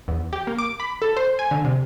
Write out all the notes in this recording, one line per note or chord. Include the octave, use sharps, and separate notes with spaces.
E2
G4
A#3
D6
B5
A4
C5
G#5
D3
C3